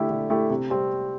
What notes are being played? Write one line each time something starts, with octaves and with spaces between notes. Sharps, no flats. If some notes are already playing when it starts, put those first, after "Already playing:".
Already playing: D3 A3 E4 G4
D3
A3 E4 G4
C3
G3 C4